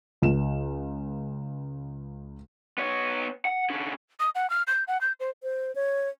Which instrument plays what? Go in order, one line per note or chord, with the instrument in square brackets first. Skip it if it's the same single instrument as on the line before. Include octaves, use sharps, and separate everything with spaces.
[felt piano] C#2 E7
[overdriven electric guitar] B3 C#5
F#5
D3 C#4
[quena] D#6
F#5
F6
G6
F#5
G6
C5
[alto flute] C5
C#5